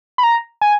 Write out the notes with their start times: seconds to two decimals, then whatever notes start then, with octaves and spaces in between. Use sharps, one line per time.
0.18 B5
0.24 A#5
0.61 G#5